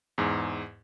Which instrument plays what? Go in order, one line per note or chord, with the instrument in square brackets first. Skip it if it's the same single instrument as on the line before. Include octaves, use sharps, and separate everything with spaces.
[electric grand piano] E2 G#2